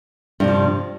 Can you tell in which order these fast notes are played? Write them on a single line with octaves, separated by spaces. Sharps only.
G2 C3 F3